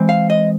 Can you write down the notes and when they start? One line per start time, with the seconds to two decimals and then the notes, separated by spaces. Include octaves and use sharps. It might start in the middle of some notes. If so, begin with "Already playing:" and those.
Already playing: E3 G#3 C4
0.09 F5
0.30 D#5